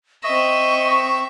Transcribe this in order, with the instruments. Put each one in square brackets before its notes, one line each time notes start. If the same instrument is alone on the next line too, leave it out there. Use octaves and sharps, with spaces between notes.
[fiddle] C4 E5 [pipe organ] D#5 [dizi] C#6